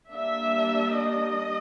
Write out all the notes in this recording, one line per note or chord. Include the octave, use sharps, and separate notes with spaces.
G3 A#3 D4 E5
D#5